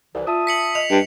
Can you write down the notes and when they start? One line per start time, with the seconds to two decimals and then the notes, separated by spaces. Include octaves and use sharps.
0.15 C2 E3 D5
0.27 F4 E5 A5 D#6
0.47 B6 C#7 F#7
0.75 D#5 F7
0.91 G2